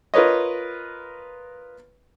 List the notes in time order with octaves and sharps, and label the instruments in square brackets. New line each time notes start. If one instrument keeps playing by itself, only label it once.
[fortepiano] F4 A#4 B4 C#5 D#5